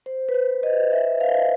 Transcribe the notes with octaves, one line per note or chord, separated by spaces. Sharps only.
C5
B4
C5
D#5
E5
F5